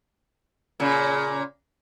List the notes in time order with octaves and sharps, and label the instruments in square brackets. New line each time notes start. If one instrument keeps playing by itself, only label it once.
[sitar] A#2 C#3